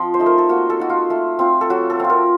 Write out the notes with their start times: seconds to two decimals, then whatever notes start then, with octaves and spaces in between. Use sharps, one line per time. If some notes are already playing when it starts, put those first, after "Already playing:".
Already playing: F3 C4 D#5
0.14 C5
0.19 A3 D#4
0.26 A#4
0.38 A4
0.49 A#3 F#4
0.70 A4
0.80 D#4 F#4
0.90 F4
1.10 A3
1.39 C4 F4
1.61 A4
1.70 F#3 F#4
1.90 A4
2.00 C4 F4
2.10 A#4